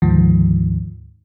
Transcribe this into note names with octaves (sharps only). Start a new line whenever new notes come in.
D2 G#2 D#3 F3